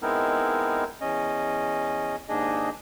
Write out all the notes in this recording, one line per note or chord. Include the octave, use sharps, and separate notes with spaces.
G#3 B3 C4 D#4 E4 A#4
E2 C#4 D#5
D#2 G#2 D4 G#4 D#5